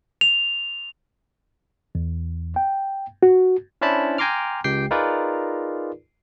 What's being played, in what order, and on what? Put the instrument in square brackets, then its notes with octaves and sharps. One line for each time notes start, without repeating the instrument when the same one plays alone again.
[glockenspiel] F7
[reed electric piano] E2
G5
F#4
[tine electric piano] C#4 D4 E4 C5 A5 B5
G5 G#5 A#5 C6 D6 F6
C#2 G4 G5 C7
D#4 F4 G#4 A#4 B4 D5